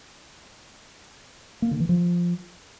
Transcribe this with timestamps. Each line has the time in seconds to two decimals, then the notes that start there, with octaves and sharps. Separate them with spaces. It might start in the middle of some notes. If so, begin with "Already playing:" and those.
1.62 A#3
1.71 D3
1.80 E3
1.89 F3